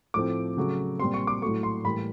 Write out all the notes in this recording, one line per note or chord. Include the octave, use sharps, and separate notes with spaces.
A2 F3 A3 C4 D6
C#3 F#3 A3
A#2 G3 C4 C6
C#6
D6
A2 F#3 A3 C#6
C6
A2 E3 G3 A#3 B5